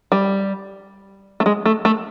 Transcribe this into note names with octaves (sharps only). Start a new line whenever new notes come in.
G3
A3
G#3
A3
A3